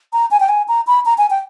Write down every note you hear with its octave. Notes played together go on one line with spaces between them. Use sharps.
A#5
G#5
G5
G#5
A#5
B5
A#5
G#5
G5